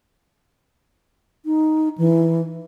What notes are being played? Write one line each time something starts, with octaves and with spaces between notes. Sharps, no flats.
D#4
E3